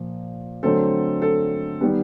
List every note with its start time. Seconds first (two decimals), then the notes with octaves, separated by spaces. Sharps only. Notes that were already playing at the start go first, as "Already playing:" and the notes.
Already playing: A#2 F3 A#3
0.63 D3 F#3 A3 C4 A4
1.22 A4
1.81 D#3 G3 B3